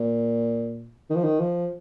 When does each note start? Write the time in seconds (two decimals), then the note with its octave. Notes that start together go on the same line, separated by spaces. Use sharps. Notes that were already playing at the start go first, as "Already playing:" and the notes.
Already playing: A#2
1.10 D#3
1.16 F3
1.24 D#3
1.40 F3